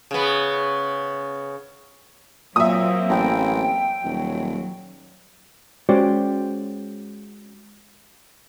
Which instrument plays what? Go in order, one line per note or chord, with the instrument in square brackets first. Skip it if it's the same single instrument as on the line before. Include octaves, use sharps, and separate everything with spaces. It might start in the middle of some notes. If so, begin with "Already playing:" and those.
[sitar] C#3 B3
[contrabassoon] A#2 [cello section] F#3 A#3 C4 [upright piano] E5 D#6
[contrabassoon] A1 [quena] G5
[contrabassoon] D#1 [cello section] F#3
[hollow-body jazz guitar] G#3 C#4 F#4 G4 C5 D5